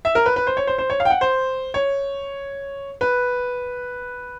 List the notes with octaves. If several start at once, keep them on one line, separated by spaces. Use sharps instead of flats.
E5
A#4
B4
B4
C5
C#5
C5
C5
C#5
F5
G5
F#5
C5
C#5
B4